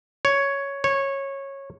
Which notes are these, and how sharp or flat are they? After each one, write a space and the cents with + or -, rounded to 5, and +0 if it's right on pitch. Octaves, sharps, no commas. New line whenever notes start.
C#5 +5
C#5 -15